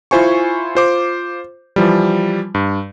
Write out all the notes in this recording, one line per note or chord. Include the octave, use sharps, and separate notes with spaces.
E4 F4 C5 G#5 C#6
F4 C5 D6
E3 F3 G3
G2